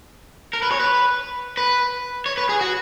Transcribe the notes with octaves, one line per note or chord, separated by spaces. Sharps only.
A#4
B4
C#5
B4
B4
C#5
B4
G#4
F#4